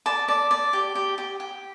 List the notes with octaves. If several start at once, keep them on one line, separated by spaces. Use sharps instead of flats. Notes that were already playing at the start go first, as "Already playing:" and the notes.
D5 A5
D5
D5
G4
G4
G4
G4